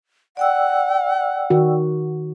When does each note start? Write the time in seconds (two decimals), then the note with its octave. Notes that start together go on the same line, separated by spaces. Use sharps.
0.37 D5 F#5 G5 E6
1.50 D#3 F#4